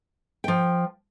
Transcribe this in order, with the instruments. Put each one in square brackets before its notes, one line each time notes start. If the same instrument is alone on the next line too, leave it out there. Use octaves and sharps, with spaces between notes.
[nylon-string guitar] F3 G5